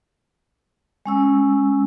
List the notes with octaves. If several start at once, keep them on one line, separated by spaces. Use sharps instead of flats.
G#3 C#4 E6